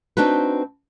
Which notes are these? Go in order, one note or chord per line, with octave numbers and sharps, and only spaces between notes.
C4 D4 D#4 F#4 B4